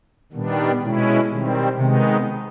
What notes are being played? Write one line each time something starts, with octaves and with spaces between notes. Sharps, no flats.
A#2 D#3 G3 B3 D4
B2 G#3 C#4 E4
B2 D#3 G3 C4
C3 D#3 G#3 B3 D#4